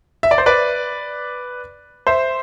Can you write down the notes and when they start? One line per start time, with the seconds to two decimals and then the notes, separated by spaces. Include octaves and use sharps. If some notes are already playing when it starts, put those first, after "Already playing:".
0.23 E5
0.31 D5
0.38 C5
0.46 B4 D5
2.07 C5 E5